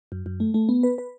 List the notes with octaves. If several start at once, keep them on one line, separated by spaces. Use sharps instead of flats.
F#2
F#2
A3
A3
B3
B4
B4